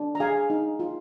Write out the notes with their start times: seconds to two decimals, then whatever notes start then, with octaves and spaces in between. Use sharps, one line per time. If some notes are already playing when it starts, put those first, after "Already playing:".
Already playing: D4
0.15 A#5
0.20 G#4 F5 G#5
0.50 D#4
0.79 F4